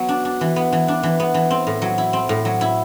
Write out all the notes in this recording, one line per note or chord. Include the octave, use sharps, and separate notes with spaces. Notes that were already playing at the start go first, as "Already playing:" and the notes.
Already playing: F#3 B3
D4
D4
E3
B3
E3
D4
E3
B3
E3
C4
A2
F#3
E4
C4
A2
F#3
E4